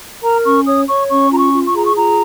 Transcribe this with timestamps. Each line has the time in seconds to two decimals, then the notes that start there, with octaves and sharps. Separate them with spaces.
0.22 A#4 A#5
0.44 C#4 C#6
0.66 C#5 D#6
0.87 C#5 C#6
1.09 C#4 C#6
1.30 F4 A#5
1.38 C#6
1.52 F4
1.66 C#6
1.74 G#4 A#5
1.85 C#6
1.96 F4 A#5